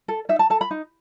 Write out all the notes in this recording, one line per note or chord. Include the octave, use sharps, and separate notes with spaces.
A4
D#4 E5
A5
A4 A5
B5
D#4